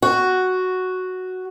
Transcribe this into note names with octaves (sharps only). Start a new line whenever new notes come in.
F#4